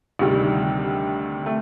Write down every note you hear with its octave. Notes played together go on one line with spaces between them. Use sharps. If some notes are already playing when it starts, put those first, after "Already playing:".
D2 C3 D#3 G3
A3